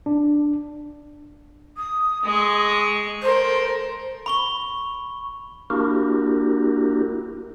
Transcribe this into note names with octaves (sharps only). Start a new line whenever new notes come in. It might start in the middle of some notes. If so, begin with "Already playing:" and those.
D4
D#6
G#3 C#6
A4 A#4 C5
B5 C#6 G7
A#3 D4 E4 F#4 G4 A#4